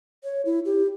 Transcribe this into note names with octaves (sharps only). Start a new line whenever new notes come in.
C#5
E4
G4